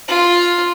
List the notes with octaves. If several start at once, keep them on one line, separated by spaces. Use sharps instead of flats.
F4